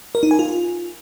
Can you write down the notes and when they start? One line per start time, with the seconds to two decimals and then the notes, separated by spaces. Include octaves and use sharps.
0.15 A#4
0.23 D#4
0.31 G#5
0.39 F4